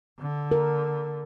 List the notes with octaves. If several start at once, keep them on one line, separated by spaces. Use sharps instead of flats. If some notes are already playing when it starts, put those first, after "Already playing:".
D3
A#4